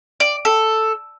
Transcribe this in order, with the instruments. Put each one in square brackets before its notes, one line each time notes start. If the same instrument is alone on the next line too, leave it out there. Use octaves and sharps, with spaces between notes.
[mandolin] D5
A4